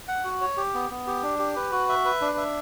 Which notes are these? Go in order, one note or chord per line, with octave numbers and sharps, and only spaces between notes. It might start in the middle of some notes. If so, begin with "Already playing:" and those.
F#5
F#4
C#5
G4
B3
B3
G4
D4
G4
B4
F#4
E5
B4
D4
E5